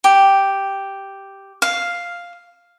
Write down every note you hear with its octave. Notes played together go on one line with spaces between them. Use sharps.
G4
F5